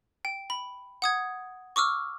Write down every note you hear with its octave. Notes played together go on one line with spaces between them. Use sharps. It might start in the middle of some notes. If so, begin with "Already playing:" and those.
G5
B5
F#5 D#6 G#6
C#6 D6 E6 F6